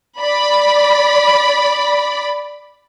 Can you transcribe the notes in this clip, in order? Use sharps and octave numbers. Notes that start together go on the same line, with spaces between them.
D5 B5